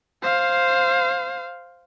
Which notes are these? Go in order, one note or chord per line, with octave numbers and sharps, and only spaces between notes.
C5 F5